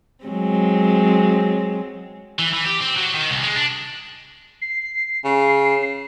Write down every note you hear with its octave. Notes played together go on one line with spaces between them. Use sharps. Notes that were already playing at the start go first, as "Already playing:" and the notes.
F#3 G#3 C4
E3
E3
G4
C4
F#3
D#3
C2
G#3
D4
C7
C#3